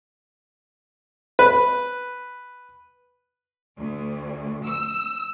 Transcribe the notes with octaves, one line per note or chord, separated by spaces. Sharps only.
B4
D2
E6